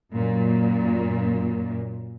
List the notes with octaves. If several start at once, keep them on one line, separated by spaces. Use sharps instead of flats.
F#2 A#2